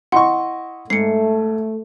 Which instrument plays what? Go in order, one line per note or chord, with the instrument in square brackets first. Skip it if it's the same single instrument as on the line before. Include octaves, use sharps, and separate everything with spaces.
[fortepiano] E4 D#5 C#6 [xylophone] F#5 C6
[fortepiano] G#2 [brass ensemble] A3 [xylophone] C7 C#7